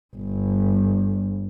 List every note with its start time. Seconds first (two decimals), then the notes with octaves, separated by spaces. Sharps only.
0.16 G1